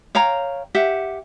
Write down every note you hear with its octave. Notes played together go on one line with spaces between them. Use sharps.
C#5 F5 G5 A#5
G4 E5 F#5